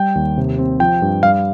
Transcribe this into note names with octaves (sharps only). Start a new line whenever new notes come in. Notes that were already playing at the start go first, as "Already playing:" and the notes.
Already playing: G3 G5
D#2
C3
C4
F3 G5
G2
G3 F5